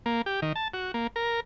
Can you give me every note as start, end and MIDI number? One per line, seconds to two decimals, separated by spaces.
0.06 0.22 58
0.26 0.40 67
0.42 0.53 51
0.56 0.68 81
0.74 0.92 66
0.94 1.07 58
1.16 1.40 70